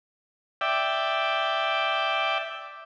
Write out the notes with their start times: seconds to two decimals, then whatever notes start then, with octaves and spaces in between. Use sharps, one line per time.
0.61 D5 E5 G5